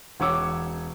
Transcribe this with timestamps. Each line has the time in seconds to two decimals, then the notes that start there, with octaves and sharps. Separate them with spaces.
0.20 E1 C#4 C#5 F#5 D6 E6